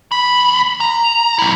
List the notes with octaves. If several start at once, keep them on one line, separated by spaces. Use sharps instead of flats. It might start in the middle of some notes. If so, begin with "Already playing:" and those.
D#2 B5
A#5
F#3 E4